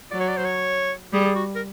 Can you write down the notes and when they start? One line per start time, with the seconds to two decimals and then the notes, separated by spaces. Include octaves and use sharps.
0.11 F#3 D5
0.20 C#5
0.29 D5
0.37 C5
0.45 C#5
1.13 G3 G#4
1.24 G#4
1.35 F#4
1.55 A#4